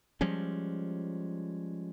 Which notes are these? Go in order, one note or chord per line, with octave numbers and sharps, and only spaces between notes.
F3 G3 G#3 C#4